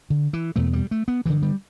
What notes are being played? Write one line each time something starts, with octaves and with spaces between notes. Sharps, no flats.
D3
E3
E2 B2 A3
G3
A3
B3
G2 D3 E3
G3